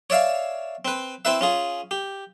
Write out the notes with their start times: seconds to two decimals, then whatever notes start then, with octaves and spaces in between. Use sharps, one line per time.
0.10 C#5 D5 E5 F5
0.85 C4 B4
1.25 C4 E4 B4 E5
1.41 C#4 F4 G#4
1.91 G4